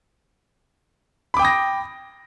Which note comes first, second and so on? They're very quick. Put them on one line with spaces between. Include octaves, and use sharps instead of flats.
B5 D6 G5 D#6 A#6